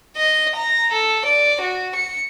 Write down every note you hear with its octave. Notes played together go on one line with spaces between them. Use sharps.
D#5
A#5
A4
D5
F#4
C#7